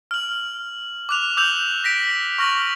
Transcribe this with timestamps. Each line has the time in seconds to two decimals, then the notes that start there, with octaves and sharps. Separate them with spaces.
0.11 F6 F#7
1.09 D6 F#6 F7
1.37 D6 E6 G6 F7 F#7
1.84 A#6 B6 D7
2.38 C#6 F6 A#6 F#7